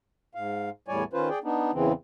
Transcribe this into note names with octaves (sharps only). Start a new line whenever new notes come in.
G#2 F5
E2 A2 G3 C#5 D5 G#5
D#3 C#4 F4 B4 C5
G#4 D5 G5
B3 D4 D#4
E2 C#3 E3 C4